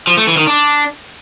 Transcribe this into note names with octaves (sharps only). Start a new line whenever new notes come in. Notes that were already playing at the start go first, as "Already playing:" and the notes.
F3
A3
E3
D#3
D4